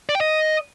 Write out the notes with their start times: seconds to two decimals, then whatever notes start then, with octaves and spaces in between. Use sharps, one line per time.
0.09 D5
0.15 G5
0.21 D#5